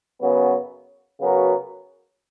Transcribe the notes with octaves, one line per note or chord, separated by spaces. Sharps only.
F#2 C#3 F#3 B3
C#3 F#3 B3 F#4 A#4